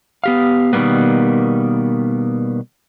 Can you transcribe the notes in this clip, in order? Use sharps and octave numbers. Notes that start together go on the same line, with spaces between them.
B3 G4 F5
B2 D#3 E3 G3 A#3 B3